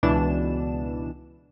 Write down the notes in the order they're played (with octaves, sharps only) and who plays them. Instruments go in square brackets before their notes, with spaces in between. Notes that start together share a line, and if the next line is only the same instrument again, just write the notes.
[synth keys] C#2 B2 E3 D4 E7